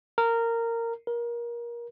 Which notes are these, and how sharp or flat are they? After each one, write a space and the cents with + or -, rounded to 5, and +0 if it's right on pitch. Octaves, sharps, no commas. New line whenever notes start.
A#4 -15
A#4 +25